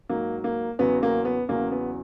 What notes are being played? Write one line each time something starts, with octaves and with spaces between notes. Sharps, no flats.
G#2 F#3 A#3
A#3
E2 C#3 F#3 B3
A#3
B3
E2 C#3 F#3 A#3
B3